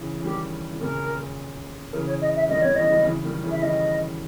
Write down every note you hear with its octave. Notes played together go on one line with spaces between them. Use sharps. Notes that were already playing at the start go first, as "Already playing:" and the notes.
Already playing: C#3 E3
E3
D#3 G3 G4
D#3
A#2 C#3 A#4
C#3 E3 A#4
C#5
D#5
E5
D#3 G3 D#5
B2 D#3 C#5
C#3 E3 D#5
D#3 G3
C#3 E3
D#3 G3
C#3 E3
E5
D#3 G3 D#5